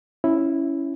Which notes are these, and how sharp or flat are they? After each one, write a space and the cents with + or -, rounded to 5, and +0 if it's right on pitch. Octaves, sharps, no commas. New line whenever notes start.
C#4 +0 E4 +0